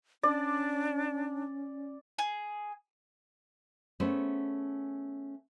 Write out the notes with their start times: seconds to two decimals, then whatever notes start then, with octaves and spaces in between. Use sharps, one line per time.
0.23 C#4 D4 D5
2.19 G#4
4.00 A3 B3 C#4 G#4 C5